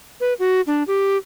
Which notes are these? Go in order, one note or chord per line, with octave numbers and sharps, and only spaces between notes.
B4
F#4
D4
G4